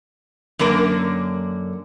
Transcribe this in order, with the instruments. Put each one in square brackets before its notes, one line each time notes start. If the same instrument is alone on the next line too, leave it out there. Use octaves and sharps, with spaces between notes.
[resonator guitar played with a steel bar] F#2 D3 A#3 A#4